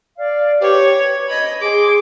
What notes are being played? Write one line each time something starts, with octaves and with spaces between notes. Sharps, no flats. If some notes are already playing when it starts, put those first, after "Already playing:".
D5 F5
G4 B4 C#5 G5 D6
G#6
D#5 B5
G#4 C6 D6